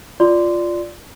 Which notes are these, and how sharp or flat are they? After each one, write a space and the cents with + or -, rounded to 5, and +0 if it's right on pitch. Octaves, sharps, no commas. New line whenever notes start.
F4 +0 D5 +0 C6 -15